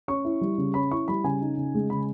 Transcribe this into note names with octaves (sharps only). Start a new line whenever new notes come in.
C#4 C#6
E4
G3
C#3
C#4 B5
E4 C#6
G3 B5
C#3 G#5
D#4
C#3
G#3
C#3 B5